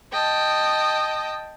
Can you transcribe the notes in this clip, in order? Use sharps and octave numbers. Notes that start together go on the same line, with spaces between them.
D#5 G5 A5